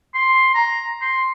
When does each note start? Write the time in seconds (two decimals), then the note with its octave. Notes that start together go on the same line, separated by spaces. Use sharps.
0.14 C6
0.55 A#5
1.02 C6